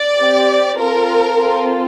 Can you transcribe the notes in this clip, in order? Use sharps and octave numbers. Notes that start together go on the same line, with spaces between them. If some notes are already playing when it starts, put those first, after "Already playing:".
Already playing: D5
C4 G4
C4 F4 A4 A#4
C4 F4 A4